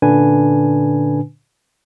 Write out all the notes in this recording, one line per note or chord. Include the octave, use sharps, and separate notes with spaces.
A#2 D3 C#4 D4 B4 G#5